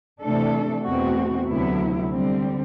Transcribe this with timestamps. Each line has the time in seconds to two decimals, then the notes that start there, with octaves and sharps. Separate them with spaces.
0.21 C3 E3 A3 D4 A4
0.84 E2 B2 A3 C4 F#4
1.48 D2 C3 F#3 B3 E4
2.11 D3 G3 C4